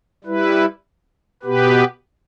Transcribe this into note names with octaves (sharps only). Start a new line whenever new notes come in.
G3 E4 B4
B2 B3 G4 B4